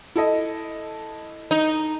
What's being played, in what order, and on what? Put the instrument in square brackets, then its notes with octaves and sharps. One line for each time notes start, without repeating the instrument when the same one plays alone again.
[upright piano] E4 A4 D#5
[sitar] D#4